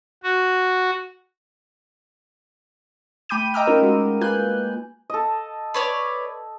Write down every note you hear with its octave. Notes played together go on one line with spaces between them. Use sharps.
F#4
A3 G5 B5 D6 G6 D#7
D#5 G5 A#5 D6 E6 F6
C#4 D#4 F4 A#4
G#3 F#4
A#3 F4 B4 G#5 F#6 G6
A4 D#5
B4 C#5 D5